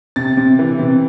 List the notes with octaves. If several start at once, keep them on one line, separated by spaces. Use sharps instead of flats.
C3 A6
C3
E3
C3